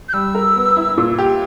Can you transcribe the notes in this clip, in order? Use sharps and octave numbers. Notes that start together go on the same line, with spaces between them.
G6
G3 E6
A#4
B3
E4
A#2
G4